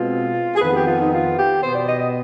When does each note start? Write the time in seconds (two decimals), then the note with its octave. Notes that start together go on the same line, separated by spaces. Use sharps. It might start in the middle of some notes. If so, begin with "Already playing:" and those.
Already playing: B2 G#3 C4 F4
0.56 G#4
0.60 F2 D#3 B3 B4
0.74 G4
0.85 F4
0.99 D#4
1.11 F4
1.36 G4
1.61 B2 B3 C5
1.73 D5
1.85 D#5
1.98 D#5